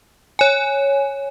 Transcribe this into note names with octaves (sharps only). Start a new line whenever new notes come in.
C#5 G#5